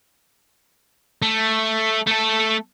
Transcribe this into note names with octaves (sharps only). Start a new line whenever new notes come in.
A3
A3 A4